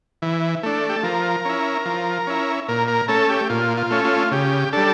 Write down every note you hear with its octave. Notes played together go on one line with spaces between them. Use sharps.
E3
A3 D4
G4
A4
F3 A#4
C#4 E4
F3
C#4 E4
A#2 A#4
A#4
A3 C#4 A4
G4
A#2 F4
F4
A3 C#4
F4
C#3 G4
G3 D4 A4